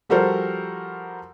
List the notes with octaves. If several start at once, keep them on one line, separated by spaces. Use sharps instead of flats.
F3 G3 F#4 A4 A#4 C5